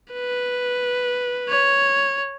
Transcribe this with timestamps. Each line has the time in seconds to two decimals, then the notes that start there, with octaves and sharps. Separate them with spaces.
0.13 B4
1.49 C#5